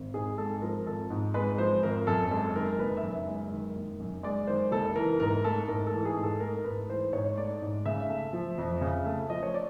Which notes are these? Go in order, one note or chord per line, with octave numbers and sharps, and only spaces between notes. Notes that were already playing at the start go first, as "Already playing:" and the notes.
Already playing: G#1
G#2 G#4
G#3 A4
F3 A#4
G#1 A4
G#2
G#3 B4
F3 C5
G#1 A#4
F#2 A4
G#3 A4
D#3 A#4
F#1 B4
E5
F#2
G#3
D#3
F#1
F#2
G#3 D5
D#3 C5
F#1 A4
E3 A#4
G#2 A#4
A3 A4
G#2 A#4
A4
E3
G#4
G#2
A4
A3 A#4
G#2 B4
E3 C5
G#2 C#5
A3 D5
G#2
C#3 E5
A3
F3
F2
C#3
A3
F3 D#5
C#5
D5